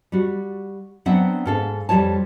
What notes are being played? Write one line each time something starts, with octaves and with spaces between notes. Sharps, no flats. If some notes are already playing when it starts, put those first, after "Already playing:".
G3 F#4
F#3 B3 C4 D4 E5 F#5
G#2 A4 F5
F2 G3 F4 C#5 A5